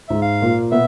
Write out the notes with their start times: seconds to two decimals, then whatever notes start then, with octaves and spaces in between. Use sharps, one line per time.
0.08 G#2 G#3 E5
0.22 F5
0.41 A#2 A#3
0.72 B2 B3 E5